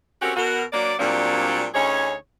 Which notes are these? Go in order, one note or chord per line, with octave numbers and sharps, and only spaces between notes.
C4 C#4 F#4 G4 A4 A#4
B2 F#4 A#4
F#3 A#3 D4 D5
A#2 F#3 G3 A#3 C4 D4
D2 C#4 D#4 G#4 C#5